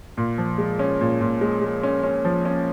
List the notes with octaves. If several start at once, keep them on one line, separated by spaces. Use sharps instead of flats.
A#2
F3
G#3
C#4
A#2
A#2
G#3
G#3
C#4
C#4
F3
C#4